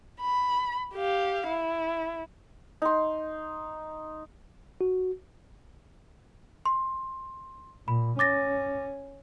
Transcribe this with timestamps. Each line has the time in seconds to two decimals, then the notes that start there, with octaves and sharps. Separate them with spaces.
0.21 B5
0.94 G4 F5
1.48 E4
2.82 D#4 C6
4.81 F#4
6.66 C6
7.88 A#2 B5
8.19 C#4 D6 A6 A#6